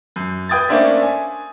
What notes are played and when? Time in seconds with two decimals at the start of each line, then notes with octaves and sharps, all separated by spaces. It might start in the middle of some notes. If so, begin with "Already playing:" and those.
0.16 F#2
0.49 B4 G5 D#6 G#6 A6
0.69 A3 A#3 C#4 D4 C5 E5
1.02 G#5